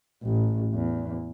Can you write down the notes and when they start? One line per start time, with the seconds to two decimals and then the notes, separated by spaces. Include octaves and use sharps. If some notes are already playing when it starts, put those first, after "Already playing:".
0.23 A1
0.74 E2